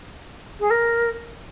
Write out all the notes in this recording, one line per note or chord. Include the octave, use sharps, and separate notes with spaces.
G#4
A#4